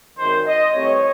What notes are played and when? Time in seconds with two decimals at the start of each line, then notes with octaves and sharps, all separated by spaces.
0.17 G#1 F#2 D#3 C5
0.46 D#5
0.74 C2 C3 E3 A3 C4 C#5